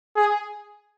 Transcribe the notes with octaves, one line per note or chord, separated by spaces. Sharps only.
G#4